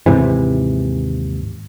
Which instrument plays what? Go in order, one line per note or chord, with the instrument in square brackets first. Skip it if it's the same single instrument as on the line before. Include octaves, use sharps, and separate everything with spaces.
[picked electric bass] D#2 G#2 C3 E3